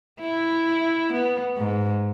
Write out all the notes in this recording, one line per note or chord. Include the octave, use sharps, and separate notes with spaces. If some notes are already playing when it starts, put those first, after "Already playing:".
E4
B3
G#2